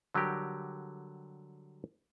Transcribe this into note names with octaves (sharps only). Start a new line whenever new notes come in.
D3 F#3 G3 G4 A#4